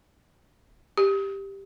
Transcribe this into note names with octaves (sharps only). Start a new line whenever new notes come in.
G4